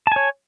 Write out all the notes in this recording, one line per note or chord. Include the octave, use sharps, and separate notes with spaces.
C#5 G#5 A5